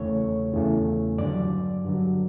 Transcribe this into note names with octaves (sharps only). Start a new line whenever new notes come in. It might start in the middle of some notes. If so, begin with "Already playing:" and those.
Already playing: E2 C#3 E3 A3 C#5
E2 C#3 E3 A3
G2 D3 F#3 D5
G2 D3 F#3